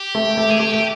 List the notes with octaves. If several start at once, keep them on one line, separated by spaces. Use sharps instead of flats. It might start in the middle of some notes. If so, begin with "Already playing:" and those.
Already playing: G4
A3
A3
G#4
A3 G4
G4